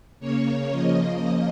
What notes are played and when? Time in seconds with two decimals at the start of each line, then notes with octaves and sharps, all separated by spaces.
0.20 C#3 A#3 C#5
0.71 C#3 F3 A#3 D#5